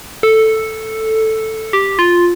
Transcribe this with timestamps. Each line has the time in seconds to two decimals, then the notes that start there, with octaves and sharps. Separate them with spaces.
0.23 A4
1.73 G4
1.99 F4